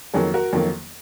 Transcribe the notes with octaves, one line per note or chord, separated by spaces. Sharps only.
F2 D#3 F#3 A#3 G#4
F#4 A#4
F2 D#3 F#3 A#3